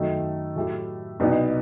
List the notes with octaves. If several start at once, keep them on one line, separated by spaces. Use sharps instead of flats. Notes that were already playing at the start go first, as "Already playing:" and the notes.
Already playing: F#2 D#3 F#3 A3 D#4
A2 F#3 A3 E4 G4
C2 B2 F#3 B3 D#4